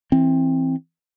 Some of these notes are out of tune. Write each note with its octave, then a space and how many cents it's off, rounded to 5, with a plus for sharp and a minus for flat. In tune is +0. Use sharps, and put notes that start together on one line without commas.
E3 +0 C4 +15